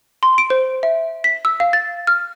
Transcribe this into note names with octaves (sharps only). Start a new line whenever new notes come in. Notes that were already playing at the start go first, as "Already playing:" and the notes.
C6
D7
C5
E5
B6
E6
F5
A6
F6